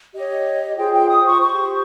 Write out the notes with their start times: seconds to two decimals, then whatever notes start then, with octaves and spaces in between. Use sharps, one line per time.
0.15 G4 C#5 D#5
0.78 F4 G#4 C5 G5
0.94 G5
1.09 D#6
1.25 C#6
1.40 G4 C5 C#6